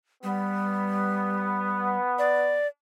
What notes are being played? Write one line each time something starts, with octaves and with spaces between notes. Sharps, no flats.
G3 B3
D5